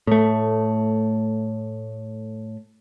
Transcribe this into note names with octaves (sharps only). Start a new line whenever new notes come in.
A2 A3